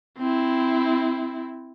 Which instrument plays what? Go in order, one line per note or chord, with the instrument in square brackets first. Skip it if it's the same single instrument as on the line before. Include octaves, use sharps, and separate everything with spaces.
[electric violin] C4 E4